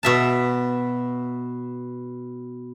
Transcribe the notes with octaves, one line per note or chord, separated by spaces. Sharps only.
B2 E5 A5